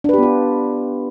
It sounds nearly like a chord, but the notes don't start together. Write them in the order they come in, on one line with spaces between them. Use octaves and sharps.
D4 B4 G4 B3 F4